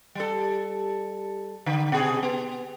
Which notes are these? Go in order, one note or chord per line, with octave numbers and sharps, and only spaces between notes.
G3 A4
D3
B2 G#4
B3